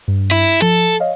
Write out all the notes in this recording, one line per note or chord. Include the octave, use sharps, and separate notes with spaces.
G2
E4
F3 A4
C#5 D#5 F5